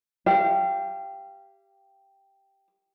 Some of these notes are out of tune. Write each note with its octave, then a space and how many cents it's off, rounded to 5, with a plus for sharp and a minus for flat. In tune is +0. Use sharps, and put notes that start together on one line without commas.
G4 +0 F5 -30